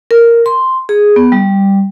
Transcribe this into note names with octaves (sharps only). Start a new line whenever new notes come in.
A#4
C6
G#4
B3
G3